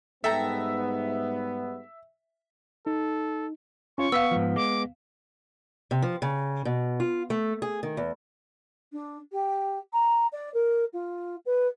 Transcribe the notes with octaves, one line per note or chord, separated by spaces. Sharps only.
G#2 G3 B3 A4 E5 G5 A#5
D#4 A4
C#4 F4 C#5 C#6
B3 F5 E6 B6
G#2 F3
G#3 D6
C3
F3
C#3
B2
F4
A3
G#4
D#3
E2
D4
G4
A#5
D5
A#4
F4
B4